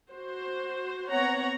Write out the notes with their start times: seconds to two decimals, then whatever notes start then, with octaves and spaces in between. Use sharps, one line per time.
0.13 F#4 C5
1.11 B3 C4 C#5 F#5 A#5